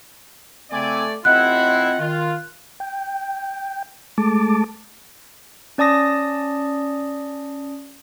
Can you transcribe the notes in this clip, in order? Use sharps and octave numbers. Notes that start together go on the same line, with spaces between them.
C#3 A3 C4 D5 G#5
A1 C4 E4 F4 D#5 F#5 F#6
D#3 F4
G5
G#3 A3 A5 D6
C#4 D5 A5 D#6 A#6